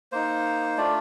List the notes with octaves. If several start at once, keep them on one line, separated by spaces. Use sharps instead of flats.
A#3 D#4 C5
A3 D4 F4 D5